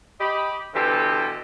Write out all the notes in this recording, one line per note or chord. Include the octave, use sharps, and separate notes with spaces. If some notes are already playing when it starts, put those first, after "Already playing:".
G4 D#5 B5
B2 D3 E3 G4 A4 C5